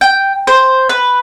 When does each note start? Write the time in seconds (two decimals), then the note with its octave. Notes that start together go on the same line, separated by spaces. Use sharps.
0.01 G5
0.47 C5
0.89 B4